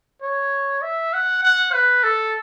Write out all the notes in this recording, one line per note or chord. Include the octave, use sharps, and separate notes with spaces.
C#5
E5
F#5
F#5
B4
A4